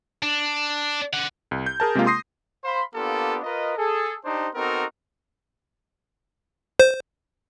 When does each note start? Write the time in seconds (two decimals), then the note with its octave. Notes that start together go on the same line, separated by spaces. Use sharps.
0.22 D4
1.13 D5 F#5
1.51 C2
1.66 G6
1.80 G#4 A#4 A5
1.95 C3 G#3 A#3 F4
2.07 C6 D#6 A#6 C7
2.64 C5 F5 B5 C6
2.95 A#3 B3 D4 F4 G4 A4
3.44 F4 A#4 B4 D#5
3.78 G#4 A4
4.25 D4 D#4 G4 C5
4.55 B3 C4 D#4 F#4 A4 A#4
6.79 C5